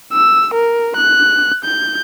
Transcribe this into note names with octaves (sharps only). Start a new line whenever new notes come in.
E6
A#4
F#6
G6